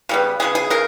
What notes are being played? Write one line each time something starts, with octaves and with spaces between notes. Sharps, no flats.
C#3 G3 B3
C#3 G3 B3 G#4
G#4
C#3 A#4